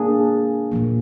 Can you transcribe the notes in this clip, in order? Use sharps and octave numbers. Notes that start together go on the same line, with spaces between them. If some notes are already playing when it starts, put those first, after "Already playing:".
Already playing: A#3 D4 G#4
A#2 F3 A#3